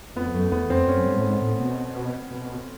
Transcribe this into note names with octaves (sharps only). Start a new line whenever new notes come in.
F2 B3
F#2 A3
E2 B3
F2 C4
F#2 C#4
G2
A2
G#2
A2
B2
B2